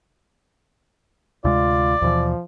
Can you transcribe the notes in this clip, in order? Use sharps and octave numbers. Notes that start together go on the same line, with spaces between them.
D2 C3 G#3 F4 D5
D#2 B2 E3 F3